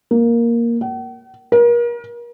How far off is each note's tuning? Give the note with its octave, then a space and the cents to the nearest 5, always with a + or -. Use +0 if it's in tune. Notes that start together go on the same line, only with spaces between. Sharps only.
A#3 +5
F#5 +45
A#4 +35